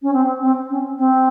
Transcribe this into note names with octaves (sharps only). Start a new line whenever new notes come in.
C#4
C4
C4
C#4
C4